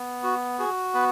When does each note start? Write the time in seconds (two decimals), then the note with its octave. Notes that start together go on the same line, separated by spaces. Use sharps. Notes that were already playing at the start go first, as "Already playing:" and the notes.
Already playing: B3
0.23 F#4
0.59 F#4 G#4
0.94 B3 B4